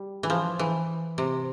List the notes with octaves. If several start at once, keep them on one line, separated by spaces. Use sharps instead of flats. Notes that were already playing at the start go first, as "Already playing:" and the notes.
Already playing: G3
E3
F3
E3
C3